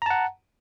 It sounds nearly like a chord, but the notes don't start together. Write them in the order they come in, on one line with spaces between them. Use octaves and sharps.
A#5 A5 F#5